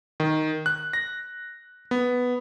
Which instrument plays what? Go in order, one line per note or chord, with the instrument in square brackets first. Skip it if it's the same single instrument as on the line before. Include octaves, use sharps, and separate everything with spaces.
[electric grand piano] D#3
F#6
A#6
B3